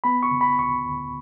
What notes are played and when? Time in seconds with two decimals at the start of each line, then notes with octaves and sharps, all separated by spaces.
0.04 B3 B5
0.23 C#6
0.31 C#3
0.41 B5
0.59 D2 C#6
0.86 D2